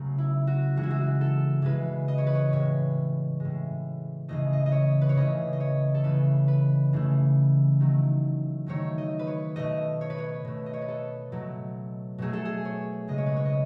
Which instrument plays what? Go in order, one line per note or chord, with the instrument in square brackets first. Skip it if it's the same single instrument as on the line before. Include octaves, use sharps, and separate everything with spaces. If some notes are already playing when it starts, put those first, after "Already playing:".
Already playing: [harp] C#3 F#3 A3
E4
F#4
C#3 E3 G#3 F#4
E4
F#4
A4
C#3 E3 G#3 B4
D#5
C#5
B4
C#5
A2 G#3 C#5
A2 G#3
C#3 E3 A3 D#5
D#5
D#5
C#5
B4
C#5
C#3 E3 A3 D#5
D#5
C#5
A4
C#3 E3 A3 B4
B4
C#3 E3 A3
D#3 F#3 A3
D#3 F#3 A3 C#5
D#5
B4
C#5
B2 A3 D#5
C#5
B4
C#5
B2 A3
D#5
C#5
B4
A4
B2 F#3 A3
B2 F#3 A3 G#4
A4
G#4
C#5
C#3 G#3 D#5
C#5
B4
C#5
D#5